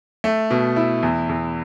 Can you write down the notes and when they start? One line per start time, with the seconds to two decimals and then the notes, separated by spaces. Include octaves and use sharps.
0.24 A3
0.51 B2
0.76 E4
1.03 E2
1.29 E2